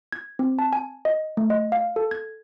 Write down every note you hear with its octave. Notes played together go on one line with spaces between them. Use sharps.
G#6
C4
A5
G#5
D#5
A3
D#5
F5
A4
G#6